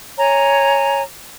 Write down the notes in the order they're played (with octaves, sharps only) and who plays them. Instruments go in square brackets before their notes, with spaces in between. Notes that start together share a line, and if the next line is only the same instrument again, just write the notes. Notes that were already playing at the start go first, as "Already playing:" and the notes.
[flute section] C#5 G#5 A#5